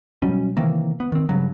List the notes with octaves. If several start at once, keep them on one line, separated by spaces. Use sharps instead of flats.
B2 F#3 G3 C#4
C3 D#3 E3 A#3
B3
D#3 C4
G2 C#3 F#3